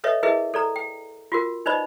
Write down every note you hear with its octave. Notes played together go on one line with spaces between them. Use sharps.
A4 B4 C#5 D#5 E5
E4 G#4 A#4 B4 D#5 E5
A4 D5 A#5
G5
F4 F#4 A#4
D#4 B4 C5 D5 D#5 B5